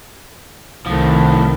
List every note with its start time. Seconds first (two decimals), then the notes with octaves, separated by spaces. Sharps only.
0.86 C2 A2 D#3 F3